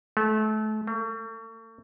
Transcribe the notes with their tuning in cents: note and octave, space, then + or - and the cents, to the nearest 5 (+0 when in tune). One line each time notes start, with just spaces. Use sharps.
A3 -30
A3 +40